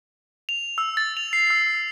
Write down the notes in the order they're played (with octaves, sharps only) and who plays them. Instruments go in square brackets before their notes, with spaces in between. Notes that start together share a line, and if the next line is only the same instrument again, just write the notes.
[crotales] F7
E6
A6
F7
C7
E6